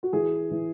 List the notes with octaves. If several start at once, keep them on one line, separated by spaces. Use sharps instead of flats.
F#4
E3 G#4
E3